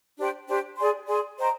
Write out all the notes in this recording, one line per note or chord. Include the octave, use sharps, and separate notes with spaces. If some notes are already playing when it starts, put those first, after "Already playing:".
D4 G4 C5 G5
D4 G4 C5 G5
G#4 D5 G#5 C6
G#4 D5 G#5 C6
C5 D#5 G5 A#5